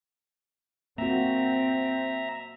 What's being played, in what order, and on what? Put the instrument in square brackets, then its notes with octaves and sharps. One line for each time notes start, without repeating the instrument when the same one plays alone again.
[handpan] A#3 F#4 [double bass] C4 [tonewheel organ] E5 A#5